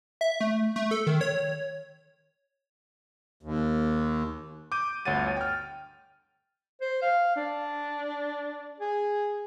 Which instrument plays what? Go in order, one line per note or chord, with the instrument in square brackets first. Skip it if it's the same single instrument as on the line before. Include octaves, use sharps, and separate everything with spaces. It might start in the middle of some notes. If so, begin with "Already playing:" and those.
[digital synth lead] E5
A3
A3
A4
D#3
C#5
[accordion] D#2
[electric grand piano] D6 G6 D#7
G1 D2 C#5 F#5 A6 D#7
G5 F6
[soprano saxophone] C5
F5
D4
G#4